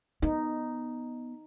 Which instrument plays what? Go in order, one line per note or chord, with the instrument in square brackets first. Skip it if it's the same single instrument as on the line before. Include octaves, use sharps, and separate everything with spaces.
[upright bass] B3 [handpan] D#4